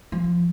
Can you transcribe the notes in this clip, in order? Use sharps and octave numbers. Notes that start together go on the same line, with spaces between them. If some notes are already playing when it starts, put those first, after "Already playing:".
F3